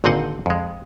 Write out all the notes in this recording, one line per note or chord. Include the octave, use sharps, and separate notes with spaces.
G#1 A#2 D3 C4 D#5 F#5
F2 G#3